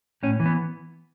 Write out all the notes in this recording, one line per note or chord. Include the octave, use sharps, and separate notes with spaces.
A2 C#4
E3
B3